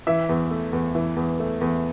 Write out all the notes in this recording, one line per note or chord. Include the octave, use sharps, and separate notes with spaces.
E3 E5
E2
A3
E2
E3
E2
A3
E2